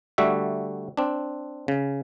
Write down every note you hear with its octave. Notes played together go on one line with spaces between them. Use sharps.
D3 G3 A3 F#4 E5
C4 D4
C#3